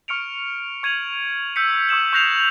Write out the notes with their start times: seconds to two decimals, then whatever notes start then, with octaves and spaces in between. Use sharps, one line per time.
0.08 C#6 F6 C#7 D7 F7
0.83 C#6 G#6 D#7 F7 F#7
1.56 E6 G6 B6 C#7
1.89 C#6 D#6 E6 E7 F#7
2.13 C#6 F#6 G6 A#6 C7 F7